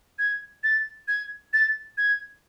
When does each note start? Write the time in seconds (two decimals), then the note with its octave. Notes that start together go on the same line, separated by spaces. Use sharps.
0.19 G#6
0.64 A6
1.08 G#6
1.53 A6
1.98 G#6